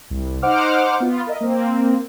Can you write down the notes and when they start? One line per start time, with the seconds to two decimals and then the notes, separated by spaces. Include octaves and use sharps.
0.10 C2
0.42 D#4 C5 F#5 D6 F6
1.00 B3 F4
1.27 A#4 D#5 E5
1.41 A#3 C4